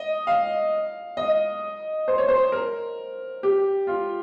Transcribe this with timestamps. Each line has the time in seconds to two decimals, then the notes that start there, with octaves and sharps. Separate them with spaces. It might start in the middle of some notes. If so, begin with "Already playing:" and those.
Already playing: D#5
0.27 F5
1.17 D#5
2.08 C5
2.18 C#5
2.28 C5
2.52 A#4
3.43 G4
3.87 F4